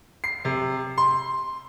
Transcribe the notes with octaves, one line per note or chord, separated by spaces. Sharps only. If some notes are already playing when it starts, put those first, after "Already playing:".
C7
C3
C6